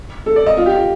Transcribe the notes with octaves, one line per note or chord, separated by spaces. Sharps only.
A4
D5
D#5
F4
G4
F4